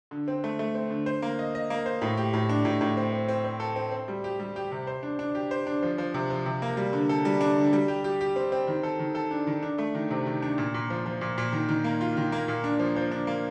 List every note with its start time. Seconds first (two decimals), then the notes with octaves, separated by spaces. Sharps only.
0.11 D3
0.28 C4
0.44 A3
0.59 A3
0.75 C4
0.90 D3
1.06 C5
1.22 A#3
1.39 D#5
1.55 D#5
1.70 A#3
1.86 C5
2.02 A2
2.17 G4
2.34 A2
2.49 D4
2.65 A2
2.81 A2
2.97 C4
3.13 C4
3.28 C4
3.45 C4
3.60 A4
3.76 C4
3.92 C4
4.08 G3
4.24 G4
4.40 G3
4.56 G4
4.72 C3
4.87 C5
5.03 D4
5.19 D4
5.35 G4
5.51 C5
5.67 D4
5.83 F3
5.98 F3
6.14 C3
6.30 F3
6.46 C3
6.62 A#3
6.77 G3
6.93 D3
7.09 A4
7.25 G3
7.41 D4
7.56 D3
7.73 G3
7.88 G4
8.04 G4
8.21 G4
8.36 C4
8.52 C4
8.67 D#3
8.83 A4
8.99 D#3
9.15 A4
9.31 D4
9.47 D#3
9.63 D4
9.78 A3
9.95 D#3
10.10 C3
10.26 D#3
10.42 D4
10.58 A#2
10.74 A#2
10.90 F3
11.06 F3
11.21 A#2
11.38 A#2
11.53 D#3
11.69 D#3
11.84 A#3
12.01 F4
12.17 D#3
12.32 A#3
12.48 A#2
12.64 D4
12.79 F3
12.96 F3
13.11 D4
13.27 A#3